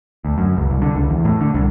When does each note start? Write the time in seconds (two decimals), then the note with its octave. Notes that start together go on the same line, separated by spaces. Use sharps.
0.25 D2
0.38 F#2
0.57 C#2
0.70 C2
0.82 D3
0.95 C#2
1.10 E2
1.24 A2
1.41 D3
1.54 C2